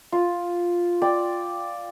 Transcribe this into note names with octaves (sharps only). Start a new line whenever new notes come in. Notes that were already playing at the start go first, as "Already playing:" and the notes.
F4
D5 G5